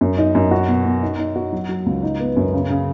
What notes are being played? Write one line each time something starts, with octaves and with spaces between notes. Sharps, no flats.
F#2
D#4
F#2
F#4
B2
B2
D#4
D#4
F#4
F#3
F#3
C#2
D#4
B3
F#2
C#3
C#3